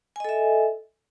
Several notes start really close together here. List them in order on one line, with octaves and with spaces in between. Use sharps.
G#5 D#5 A4 E5